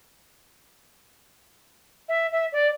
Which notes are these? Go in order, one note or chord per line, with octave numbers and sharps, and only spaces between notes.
E5
E5
D5